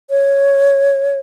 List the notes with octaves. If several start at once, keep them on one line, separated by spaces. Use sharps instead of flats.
C#5